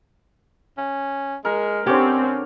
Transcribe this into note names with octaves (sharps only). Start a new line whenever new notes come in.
C#4
G#3 A#4
D3 C4 C#4 G4 C#5